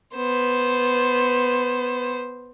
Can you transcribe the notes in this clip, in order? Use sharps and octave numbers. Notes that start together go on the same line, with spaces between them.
B3 C5